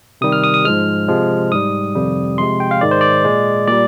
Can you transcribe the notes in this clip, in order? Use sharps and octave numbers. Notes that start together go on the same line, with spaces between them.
C3 D#3 G3 D#6
F6
D#6
D#6
G#2 F3 G#3 F6
C3 F3 G#3
G#2 G3 D#6
F2 C3 D#3 G3
C3 F3 G#3 C6
G5
F5
G#2 D#3 G#3 D5
C5
D5
A#2 G#3
A#2 G3 D5